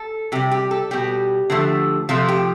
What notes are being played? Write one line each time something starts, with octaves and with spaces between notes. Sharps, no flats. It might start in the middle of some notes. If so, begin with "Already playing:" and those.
Already playing: A4
C3 G3 G4
G4
A4
B2 G3 G4
D3 F3 A3
C3 F3 A3 F4
G4